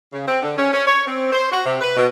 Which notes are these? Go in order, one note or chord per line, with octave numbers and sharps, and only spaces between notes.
C#3
C4
D3
C#4
C#4
C#5
C4
C5
F#4
C3
B4
B2